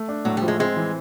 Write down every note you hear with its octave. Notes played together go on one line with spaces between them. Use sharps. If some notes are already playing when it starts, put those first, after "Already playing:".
Already playing: A3
D4
A2 F#3
G3
F3
G#3
G#3 C4
E3